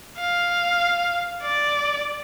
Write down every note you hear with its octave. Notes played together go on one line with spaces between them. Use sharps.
F5
D5